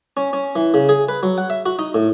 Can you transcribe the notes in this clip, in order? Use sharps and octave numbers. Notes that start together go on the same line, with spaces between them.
C#4
C#4
E3
C#3
G#4
B4
F#3
F#5
E5
F#4
D#4
A2